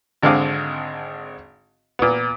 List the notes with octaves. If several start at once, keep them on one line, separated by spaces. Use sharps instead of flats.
G#1 D3 G#3 C4 F5 D6
A#2 B3